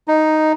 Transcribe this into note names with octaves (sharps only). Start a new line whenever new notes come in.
D#4